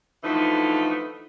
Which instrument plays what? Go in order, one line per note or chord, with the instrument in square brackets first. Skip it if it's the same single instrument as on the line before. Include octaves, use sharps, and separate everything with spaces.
[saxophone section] D3 E3 F3 A3 D#4